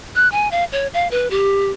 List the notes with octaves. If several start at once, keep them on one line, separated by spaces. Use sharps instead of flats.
F#6
G#5
F5
C#5
F5
B4
G4